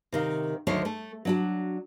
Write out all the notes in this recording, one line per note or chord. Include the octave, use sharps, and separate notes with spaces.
C3 D#3 F5
D2 D#3 F#3 D4 C5 C#5
A3
F#3 D4 F#4